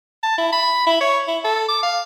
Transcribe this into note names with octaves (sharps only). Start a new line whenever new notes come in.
A5
E4
B5
E4
C#5
E4
A4
D6
F5